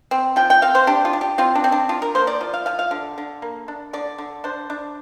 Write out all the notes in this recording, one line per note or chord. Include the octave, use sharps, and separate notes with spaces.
C4
F3 G5
G5
C4 F5
C5
D4 G4
F4
D4
G4
C4 F4
D4
C4
D4
D4 F4
A#4
A#3 C5
D5
F3
F5
F3 F5
F5
D3
D3
A#3
D4
D3 D5
D3
D4 C5
D4